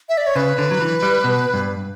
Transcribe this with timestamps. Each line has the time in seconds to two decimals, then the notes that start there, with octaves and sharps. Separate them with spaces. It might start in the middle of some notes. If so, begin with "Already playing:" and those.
0.09 E5
0.17 D5
0.27 C#5
0.36 C#3 B4
0.58 D3
0.71 F#3
0.81 E3
1.02 G3
1.24 B2
1.54 G2